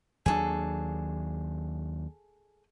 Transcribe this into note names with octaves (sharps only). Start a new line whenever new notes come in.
D#2 F#3 D4 G#4 A4